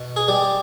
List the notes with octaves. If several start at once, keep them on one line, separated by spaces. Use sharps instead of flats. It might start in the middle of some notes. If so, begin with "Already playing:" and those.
Already playing: B2
G#4
G3 G4